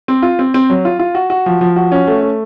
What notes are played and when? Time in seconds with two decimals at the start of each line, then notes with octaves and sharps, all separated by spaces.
0.08 C4
0.22 F4
0.39 C4
0.54 C4
0.70 F#3
0.85 F4
0.99 F4
1.15 F#4
1.30 F#4
1.46 F3
1.61 F3
1.76 F#4
1.92 C#4
2.07 A3
2.22 A3